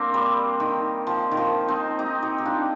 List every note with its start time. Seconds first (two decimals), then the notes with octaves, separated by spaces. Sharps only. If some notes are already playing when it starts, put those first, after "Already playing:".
Already playing: A#3 C4 D4
0.14 G3
0.60 D#3
1.07 F3
1.31 D#3
1.37 F3
1.68 C4 D#4
1.99 D#4 G4
2.22 D#4 G4
2.38 G4
2.45 D4 F4